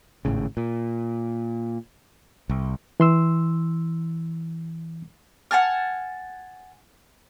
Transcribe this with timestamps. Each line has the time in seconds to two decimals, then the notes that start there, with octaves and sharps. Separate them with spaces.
0.25 G#1 A2 C#3
0.57 A#2
2.50 C2
3.00 E3 C6 E6
5.51 F#5 G#5 A5 F6